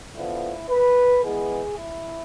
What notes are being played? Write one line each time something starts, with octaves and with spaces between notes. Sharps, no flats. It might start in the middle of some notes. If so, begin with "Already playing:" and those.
D3 F3 B3 E4
B4
E3 G#3 B3 G#4
E4